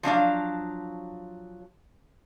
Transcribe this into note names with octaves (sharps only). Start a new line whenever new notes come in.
F3 F#3 D4 F5